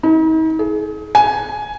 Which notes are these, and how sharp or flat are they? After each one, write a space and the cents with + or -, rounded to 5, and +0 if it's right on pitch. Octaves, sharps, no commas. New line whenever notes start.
D#4 +45
G#4 +30
G#5 +10